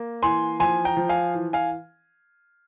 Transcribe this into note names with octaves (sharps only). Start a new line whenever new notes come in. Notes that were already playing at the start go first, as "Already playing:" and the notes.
Already playing: A#3
E3 G#5 C6
F3 G#5 C6
G5 A#5
F3
F5 G#5
E3
F5 G#5